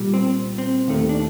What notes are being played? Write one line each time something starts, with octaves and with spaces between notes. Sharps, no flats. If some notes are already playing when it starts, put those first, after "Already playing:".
Already playing: C2 A#2 G3
C4
C4
D#2 D#3 A3
D4